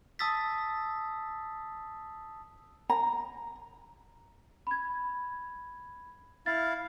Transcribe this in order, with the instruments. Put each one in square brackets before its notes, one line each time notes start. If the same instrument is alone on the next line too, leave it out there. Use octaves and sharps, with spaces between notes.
[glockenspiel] A5 D#6 E6 A6 B6
[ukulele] A#5
[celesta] B5 G#6
[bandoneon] E4 F5 [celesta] A6